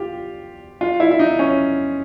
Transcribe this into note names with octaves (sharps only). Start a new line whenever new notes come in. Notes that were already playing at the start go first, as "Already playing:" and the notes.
Already playing: F4 G4
F4
E4
E4
D#4
C#4